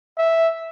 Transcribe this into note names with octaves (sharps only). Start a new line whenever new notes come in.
E5